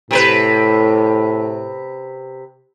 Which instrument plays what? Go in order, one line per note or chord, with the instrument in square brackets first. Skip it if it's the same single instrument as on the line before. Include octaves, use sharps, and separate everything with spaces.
[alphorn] A2 [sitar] C3 A#4 B4